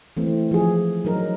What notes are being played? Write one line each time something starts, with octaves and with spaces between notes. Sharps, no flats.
E3 A3 C4
F3 G#4
F#3 D#4 A#4